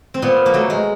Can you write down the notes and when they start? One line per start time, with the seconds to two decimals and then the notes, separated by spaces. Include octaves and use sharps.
0.14 C4
0.22 A#2 B3
0.46 A#3
0.54 F#3 A3
0.70 G#3